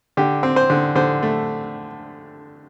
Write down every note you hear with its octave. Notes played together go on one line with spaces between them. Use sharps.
D3 G4
C4
C5
D3
D3 C5
A3